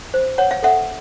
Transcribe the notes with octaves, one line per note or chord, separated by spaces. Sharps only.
C5
C#5 F#5
F5
A4 E5 F#5